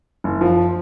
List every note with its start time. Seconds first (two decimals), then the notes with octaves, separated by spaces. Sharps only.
0.24 F#1
0.41 F3